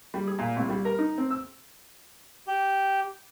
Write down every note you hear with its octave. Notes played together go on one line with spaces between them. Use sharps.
G3
G#4
A#2
C2
G3
A#4
D#4
C4
E6
G4